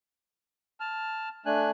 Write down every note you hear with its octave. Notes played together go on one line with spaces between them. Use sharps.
A5 F6
A3 D4 G#5 F#6